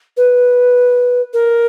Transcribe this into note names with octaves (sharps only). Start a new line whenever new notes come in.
B4
A#4